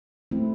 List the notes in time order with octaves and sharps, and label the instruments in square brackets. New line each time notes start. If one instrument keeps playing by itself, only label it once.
[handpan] A3 C4 E4